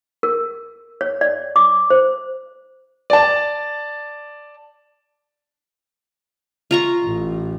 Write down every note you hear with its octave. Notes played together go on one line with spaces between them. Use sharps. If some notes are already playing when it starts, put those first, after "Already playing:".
A#4
C#5
D5
D6
C5
D5 A5
F4 A#5 C#6
A1